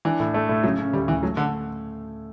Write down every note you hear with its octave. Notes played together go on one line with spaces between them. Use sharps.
E3 D4
A2
A3
A2
C#3 F#3
C#4
D2 G3
D2 E3
F#3 A3
D3 A3